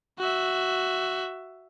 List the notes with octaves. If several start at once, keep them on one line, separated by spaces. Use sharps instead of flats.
F#4 E5